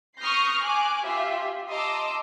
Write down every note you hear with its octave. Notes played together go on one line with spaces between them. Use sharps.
C#6 D#6 F6 G6 A#6 C7
G#5 D6 F#6
F4 G4 E5
D#5 A5 A#5 C6 D6 E6